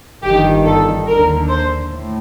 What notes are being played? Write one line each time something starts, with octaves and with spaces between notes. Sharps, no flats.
G1 G2 D#3 G4
A4
D#2 D3 A#4
C5
A2